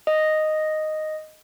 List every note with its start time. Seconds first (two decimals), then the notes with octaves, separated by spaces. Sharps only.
0.07 D#5